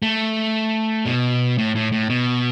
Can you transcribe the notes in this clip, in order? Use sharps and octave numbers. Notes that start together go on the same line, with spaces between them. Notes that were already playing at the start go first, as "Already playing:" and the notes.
A3
B2
A2
A2
A2
B2